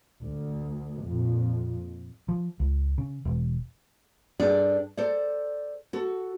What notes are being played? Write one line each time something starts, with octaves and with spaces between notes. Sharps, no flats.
D2
F2 A#2
F3
C#2
C#3
E1
G2 D4 G#4 A4 D5
A4 C5 D5
F#4 A4